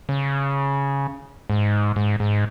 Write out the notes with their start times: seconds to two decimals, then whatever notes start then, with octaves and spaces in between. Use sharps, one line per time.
0.09 C#3
1.50 G#2
1.96 G#2
2.20 G#2